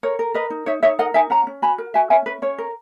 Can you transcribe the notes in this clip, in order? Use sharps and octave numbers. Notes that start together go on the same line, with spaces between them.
A#4 C#5
A#4
A#4 B4 D#5
D#4
D#4 C#5 E5
D#4 C#5 E5
A#4 D#5 F#5
D#4 E5 G#5
C#4 F#5 A#5
C#4
F#4 G#5 B5
A#4
F#4 E5 G#5
C#4 E5 G#5
C#4 B4
C#4 C#5
A#4